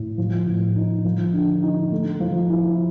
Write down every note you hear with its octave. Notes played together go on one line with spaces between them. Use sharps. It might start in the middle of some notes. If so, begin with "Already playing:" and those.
Already playing: A2
F3
A2
D#4
F3
D3
D#4
A3
F3
E4